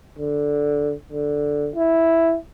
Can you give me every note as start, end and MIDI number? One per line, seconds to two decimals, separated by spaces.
0.18 0.93 50
1.12 1.69 50
1.75 2.37 64